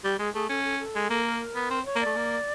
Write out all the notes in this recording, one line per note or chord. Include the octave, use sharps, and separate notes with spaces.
G3 G4
G#3 G#4
A3 G#4
C#4 A4
A4
A4
G#3
A#3
A#4
B3
C4
C5
C#5
A#3
A3 D5
A#3